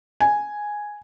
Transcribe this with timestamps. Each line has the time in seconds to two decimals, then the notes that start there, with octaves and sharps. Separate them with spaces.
0.20 G#5